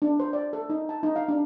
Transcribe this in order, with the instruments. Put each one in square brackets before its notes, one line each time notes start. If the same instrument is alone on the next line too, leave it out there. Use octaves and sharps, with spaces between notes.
[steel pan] D4
C5
D5
A4
D#4
A5
D#4
F5
D4